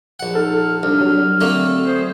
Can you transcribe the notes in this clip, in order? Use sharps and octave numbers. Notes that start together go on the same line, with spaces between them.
A#1 F#5
D#4 A4 F6
C2 D4
F#3
D3 A3 A#3 C4
G#4 C5